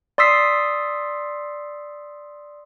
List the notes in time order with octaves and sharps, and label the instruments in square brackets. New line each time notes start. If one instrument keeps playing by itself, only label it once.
[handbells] D5 C6 D#6 E6 B6 C7